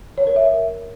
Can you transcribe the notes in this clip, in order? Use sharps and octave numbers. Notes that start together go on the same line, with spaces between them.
C#5
A#4
E5